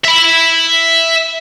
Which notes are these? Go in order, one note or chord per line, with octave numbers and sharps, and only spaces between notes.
E5 B5